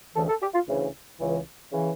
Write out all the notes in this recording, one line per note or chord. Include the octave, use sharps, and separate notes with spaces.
D2 C#3 E3 A4
A4
G4
F4
D2 C#3 E3
C#2 C#3 E3
C#3 E3